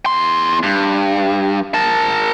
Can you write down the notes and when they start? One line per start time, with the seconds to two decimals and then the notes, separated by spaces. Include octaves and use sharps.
0.06 E2 C6
0.63 G2
1.74 A#4 A5